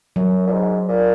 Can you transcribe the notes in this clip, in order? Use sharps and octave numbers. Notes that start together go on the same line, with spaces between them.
F#2 F#3
A#2
G#2
A#2